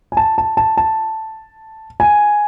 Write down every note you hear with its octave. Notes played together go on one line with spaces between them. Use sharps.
G#5
A5
A5
A5
A5
G#5